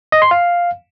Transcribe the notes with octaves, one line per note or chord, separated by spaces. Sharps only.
D#5
C6
F5